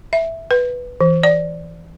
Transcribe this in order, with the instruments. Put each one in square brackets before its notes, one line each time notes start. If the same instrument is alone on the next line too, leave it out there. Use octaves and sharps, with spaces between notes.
[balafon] E5
B4
E3
D5